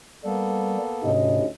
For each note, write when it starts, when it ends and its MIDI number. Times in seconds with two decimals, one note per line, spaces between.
0.24 0.78 55
0.24 1.11 58
0.24 1.11 59
0.24 1.11 69
1.03 1.46 38
1.03 1.41 44
1.03 1.41 48
1.03 1.46 61
1.03 1.46 75